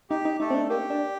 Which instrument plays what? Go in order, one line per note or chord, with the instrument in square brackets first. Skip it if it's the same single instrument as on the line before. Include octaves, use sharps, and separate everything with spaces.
[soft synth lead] D#4 [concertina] G4
[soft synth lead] D#4
[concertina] A3 A4 [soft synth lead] D#4
[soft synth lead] C4
D4
[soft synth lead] A#3 [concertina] G4
[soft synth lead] D4